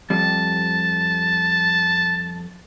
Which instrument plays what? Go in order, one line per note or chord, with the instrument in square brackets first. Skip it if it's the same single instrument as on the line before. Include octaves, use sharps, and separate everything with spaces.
[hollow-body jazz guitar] F2 G3 [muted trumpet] A5